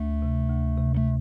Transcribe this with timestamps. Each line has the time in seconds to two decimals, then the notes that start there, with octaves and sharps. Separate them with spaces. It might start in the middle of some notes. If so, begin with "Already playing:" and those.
Already playing: D2 A3
0.22 C3
0.49 D2
0.78 C3
0.97 A3